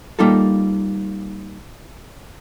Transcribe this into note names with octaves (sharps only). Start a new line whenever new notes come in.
G3 A#3 D#4 F4 A4